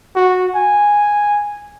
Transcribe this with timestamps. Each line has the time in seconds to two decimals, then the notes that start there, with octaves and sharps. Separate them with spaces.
0.16 F#4
0.56 G#5